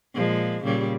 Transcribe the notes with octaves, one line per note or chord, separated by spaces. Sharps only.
A#2 F3 G#3
A#2 C#3 G3